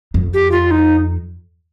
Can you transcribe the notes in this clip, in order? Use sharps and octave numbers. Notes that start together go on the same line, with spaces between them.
F2
G4
F4
D#4